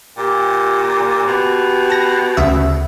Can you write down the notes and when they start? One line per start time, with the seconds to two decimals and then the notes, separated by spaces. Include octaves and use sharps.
0.17 A#2 G4
1.27 B2
1.90 A5 A#6
2.37 D2 C#3 E5